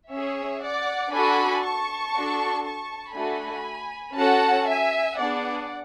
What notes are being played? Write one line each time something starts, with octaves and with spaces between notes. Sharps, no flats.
C#4 G#4 C#5 E5
D5 F#5
D4 F#4 A4 G#5 B5
A5 C#6
D4 F#4 A4
A5 C#6
A3 D4 F#4 A4 G#5 B5
C#4 F#4 A4 F#5 A5
E5 G#5
B3 D4 G#4 D5 F#5